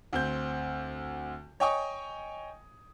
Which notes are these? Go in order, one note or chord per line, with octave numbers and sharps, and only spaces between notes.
D2 C4 G6
C#5 D#5 G5 G#5 C#6 D#6